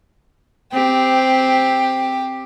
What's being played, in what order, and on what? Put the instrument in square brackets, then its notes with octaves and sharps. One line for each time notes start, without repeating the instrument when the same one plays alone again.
[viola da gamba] C4 [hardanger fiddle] G4